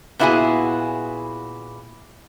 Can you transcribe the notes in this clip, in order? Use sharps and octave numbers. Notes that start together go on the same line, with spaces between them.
A#2 B3 E4 F#4 G#4 G#5